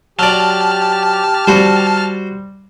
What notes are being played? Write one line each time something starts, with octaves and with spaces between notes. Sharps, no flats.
F#3 G4 D5 A5 F6
G3 F#4 C5